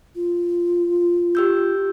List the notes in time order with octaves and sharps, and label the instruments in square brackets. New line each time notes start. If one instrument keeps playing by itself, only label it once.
[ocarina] F4
[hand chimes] G4 E6 G6